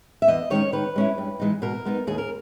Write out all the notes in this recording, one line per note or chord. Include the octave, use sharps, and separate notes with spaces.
E5
E2 D#5
D#3 G#3 C#4 C#5
D#3 B4
G#3 C#4 E4
G2
E3 G#3 D#4
B2 A#4
G#3 B3 D#4
D#2 G#4
A#4